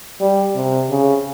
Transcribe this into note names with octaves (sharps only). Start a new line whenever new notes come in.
G3
C3
C#3